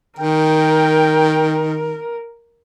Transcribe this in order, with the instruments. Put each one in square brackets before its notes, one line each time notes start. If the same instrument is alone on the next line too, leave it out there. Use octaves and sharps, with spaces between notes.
[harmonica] D#3 [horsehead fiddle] A#4 [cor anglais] G5